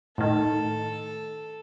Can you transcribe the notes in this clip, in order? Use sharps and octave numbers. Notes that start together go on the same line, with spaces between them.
A2 D#3 A4